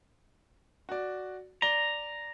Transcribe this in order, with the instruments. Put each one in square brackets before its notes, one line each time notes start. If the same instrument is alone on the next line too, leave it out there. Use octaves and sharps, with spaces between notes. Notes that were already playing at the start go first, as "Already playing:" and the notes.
[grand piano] F#4 D5
[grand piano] D5 G7 [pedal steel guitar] A#5